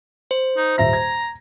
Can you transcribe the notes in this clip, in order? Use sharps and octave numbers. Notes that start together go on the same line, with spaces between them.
C5
D#4
D#1 E5 A#5 A#6
G#6